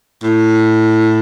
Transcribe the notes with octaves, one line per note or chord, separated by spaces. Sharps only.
A2